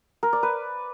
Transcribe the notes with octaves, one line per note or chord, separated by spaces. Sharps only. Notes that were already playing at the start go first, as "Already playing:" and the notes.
A#4
D5
B4